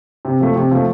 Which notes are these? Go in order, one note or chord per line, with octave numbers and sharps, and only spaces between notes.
C3
F3 A3
C3
F3 A3